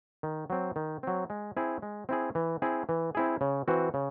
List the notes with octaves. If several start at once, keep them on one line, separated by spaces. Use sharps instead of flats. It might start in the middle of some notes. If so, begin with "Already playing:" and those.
D#3
F#3 C4
D#3
F#3 C4
G#3
C4 E4 G#4
G#3
C4 E4 G#4
E3
C4 E4 G#4
E3
C4 E4 G#4
C#3
E3 C4 F#4
C#3